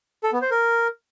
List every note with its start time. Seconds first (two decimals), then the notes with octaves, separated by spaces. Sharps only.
0.23 A4
0.33 B3
0.42 C5
0.51 A#4